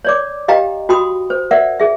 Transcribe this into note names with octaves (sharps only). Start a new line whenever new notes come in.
C#5 D5 D6
G4 D#5 F5 G5 A#5
F#4 G5 B5 C6 D#6
C5
A#4 D5 E5 F#5
G#4 E5